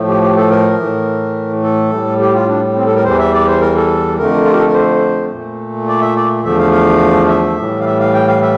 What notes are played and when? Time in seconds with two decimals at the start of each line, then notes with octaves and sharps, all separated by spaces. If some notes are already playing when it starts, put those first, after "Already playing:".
Already playing: A2 F3 A3
0.08 G4
0.22 G4
0.37 A4
0.50 A#4
0.78 A2 E3 A3
1.63 A4
1.92 A2 G3
2.21 G4
2.34 F4
2.48 D4
2.76 C4
2.86 A4
2.95 A#4
3.04 E2 E3 G3 C5
3.19 E5
3.33 D5
3.47 C5
3.61 A#4
3.76 A4
4.17 F2 D3 A3 A#4
4.45 F4
4.51 G4
4.59 A4
4.67 A#4
4.74 C5
5.32 A#2 A3
5.88 D5
6.01 E5
6.16 D5
6.44 E2 D3 F3 A3 E5
6.58 F5
6.72 F5
7.28 E5
7.57 A2 E3 G3
7.80 F5
7.85 E5
8.00 F5
8.14 G5
8.27 F5
8.42 E5